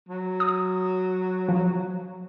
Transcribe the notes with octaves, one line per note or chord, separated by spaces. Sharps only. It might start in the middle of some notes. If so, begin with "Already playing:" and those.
F#3
D#6
F3